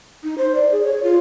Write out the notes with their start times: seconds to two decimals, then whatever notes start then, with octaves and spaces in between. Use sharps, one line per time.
0.23 D#4
0.38 C5
0.55 D5
0.72 G#4
0.85 C#5
1.03 F4